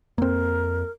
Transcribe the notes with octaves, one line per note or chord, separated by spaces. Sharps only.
F2 A#3 C4 A#4